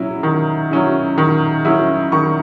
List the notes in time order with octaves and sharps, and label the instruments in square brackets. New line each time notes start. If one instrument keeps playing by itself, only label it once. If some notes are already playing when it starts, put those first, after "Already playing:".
Already playing: [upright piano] F#3 C#4 E4
D#3
F#3 C#4 E4
D#3
F#3 C#4 E4
D#3 C#6